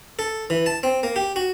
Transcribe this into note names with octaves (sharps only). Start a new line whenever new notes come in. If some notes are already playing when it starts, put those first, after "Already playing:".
A4
E3
A5
C4
A#3
G4
F#4